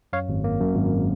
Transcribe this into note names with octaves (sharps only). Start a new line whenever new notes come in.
F#2 C#5 F5
G#1
A#3
F#2
G#1